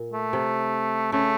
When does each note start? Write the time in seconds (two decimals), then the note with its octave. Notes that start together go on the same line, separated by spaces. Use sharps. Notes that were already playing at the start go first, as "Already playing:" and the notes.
Already playing: A#2
0.13 A3
0.33 C3
1.12 C#3 A3